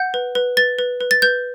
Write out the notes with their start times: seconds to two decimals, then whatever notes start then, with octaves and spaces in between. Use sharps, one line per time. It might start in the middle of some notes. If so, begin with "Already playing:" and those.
Already playing: F#5 G6
0.14 B4
0.35 B4
0.57 B4 A6
0.79 B4
1.01 B4
1.11 A6
1.22 B4 G6